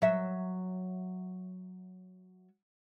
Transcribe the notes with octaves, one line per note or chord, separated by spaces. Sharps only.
F#3 E5